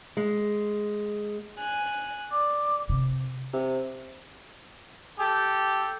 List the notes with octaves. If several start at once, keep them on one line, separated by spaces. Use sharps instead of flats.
G#3
G#5 F#6
D5 D6
C3
C3
G4 A4